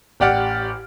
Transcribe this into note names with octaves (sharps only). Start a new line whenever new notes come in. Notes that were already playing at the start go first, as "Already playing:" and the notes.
A1 G4 D5 F#5 F6 D7